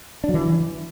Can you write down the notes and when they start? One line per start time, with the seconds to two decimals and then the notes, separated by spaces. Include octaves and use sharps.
0.24 D4
0.29 F#3
0.34 E3